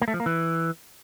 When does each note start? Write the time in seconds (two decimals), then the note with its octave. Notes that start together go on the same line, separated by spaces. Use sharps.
0.02 A#3
0.08 A3
0.14 F3
0.20 A#3
0.26 E3